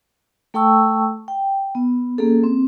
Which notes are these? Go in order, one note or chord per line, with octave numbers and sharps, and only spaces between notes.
A3 A4 G5 A5 C#6 E6
G5
B3
A#3 C#4 G#4 A4
C4